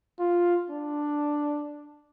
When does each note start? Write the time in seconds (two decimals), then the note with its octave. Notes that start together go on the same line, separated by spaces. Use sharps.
0.19 F4
0.70 D4